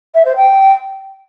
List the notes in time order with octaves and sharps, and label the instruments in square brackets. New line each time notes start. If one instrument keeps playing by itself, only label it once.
[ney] E5
C5
G5